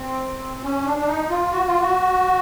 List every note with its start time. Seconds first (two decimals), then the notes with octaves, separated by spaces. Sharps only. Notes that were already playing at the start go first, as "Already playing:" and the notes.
Already playing: C4
0.57 C4
0.63 C#4
0.85 D4
0.97 D4
1.07 D#4
1.29 F4
1.52 F#4
1.66 F4
1.80 F#4